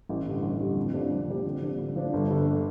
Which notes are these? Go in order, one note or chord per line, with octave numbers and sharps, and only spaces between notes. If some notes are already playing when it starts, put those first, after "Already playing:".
A1
G2 D3
A1
G2 D3
F2
C3 F3 D4 G4
F2
C3 F3 D4 G4
D3
F3 D4
D3
F3 D4
G1
G2 D3 G3